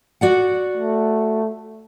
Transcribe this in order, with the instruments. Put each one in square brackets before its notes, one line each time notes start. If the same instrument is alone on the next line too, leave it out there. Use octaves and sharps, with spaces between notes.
[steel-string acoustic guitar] F#4 D5 F#5
[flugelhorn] A3